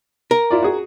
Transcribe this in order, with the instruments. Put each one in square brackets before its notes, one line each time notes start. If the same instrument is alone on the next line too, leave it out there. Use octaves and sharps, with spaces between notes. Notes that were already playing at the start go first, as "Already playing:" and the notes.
[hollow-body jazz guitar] A#4
[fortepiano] E4 F4 D5
F#4 G#4